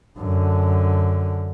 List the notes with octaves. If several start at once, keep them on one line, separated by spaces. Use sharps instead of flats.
F#2 D3